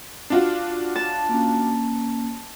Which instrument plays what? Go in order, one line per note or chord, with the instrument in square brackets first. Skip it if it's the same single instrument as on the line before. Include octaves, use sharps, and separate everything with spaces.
[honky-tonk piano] D4 F4 F#4
[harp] A5
[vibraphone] A#3 C#4